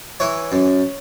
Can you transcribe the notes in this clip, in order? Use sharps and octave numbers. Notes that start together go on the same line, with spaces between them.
E3 C#5
F#2